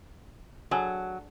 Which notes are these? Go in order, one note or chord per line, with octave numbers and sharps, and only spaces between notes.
F#3 D4 G#4 A4